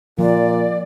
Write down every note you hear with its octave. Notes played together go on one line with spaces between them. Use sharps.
A#2 F3 D5